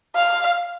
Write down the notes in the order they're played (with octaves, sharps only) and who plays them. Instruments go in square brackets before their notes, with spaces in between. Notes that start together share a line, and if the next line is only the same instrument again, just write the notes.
[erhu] F5